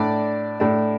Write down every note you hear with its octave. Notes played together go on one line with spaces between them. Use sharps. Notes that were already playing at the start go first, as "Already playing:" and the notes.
Already playing: A2 A3 D4 D5
A2 A3 D4